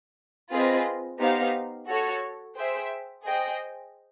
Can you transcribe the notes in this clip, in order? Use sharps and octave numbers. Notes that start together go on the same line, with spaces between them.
C4 F4 G#4 B4 D#5
B3 D#4 G4 C5 F5
F#4 A4 C#5
G#4 C5 E5 G5
G#4 C5 D#5 G5